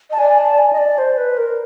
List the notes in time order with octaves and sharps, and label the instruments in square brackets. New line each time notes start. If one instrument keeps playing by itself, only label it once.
[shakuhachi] D#5 [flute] A5
[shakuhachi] D5 [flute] G#5
[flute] G#5
A5
G#5
D#5
D5
C5
B4
A#4